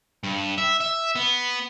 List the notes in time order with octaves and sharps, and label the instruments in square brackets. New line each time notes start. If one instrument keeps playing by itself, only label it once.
[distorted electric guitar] G2
E5
E5
B3